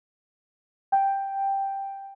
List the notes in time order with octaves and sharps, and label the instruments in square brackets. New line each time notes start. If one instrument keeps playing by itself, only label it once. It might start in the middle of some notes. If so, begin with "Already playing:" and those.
[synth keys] G5